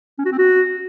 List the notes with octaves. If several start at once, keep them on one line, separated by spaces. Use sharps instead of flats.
C#4
F#4
C4
F#4